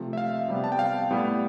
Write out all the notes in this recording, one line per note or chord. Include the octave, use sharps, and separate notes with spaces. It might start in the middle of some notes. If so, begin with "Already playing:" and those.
Already playing: C3 F3 A3
E5
F5
C3 G3 B3
A5
G5
F5
A2 G3 B3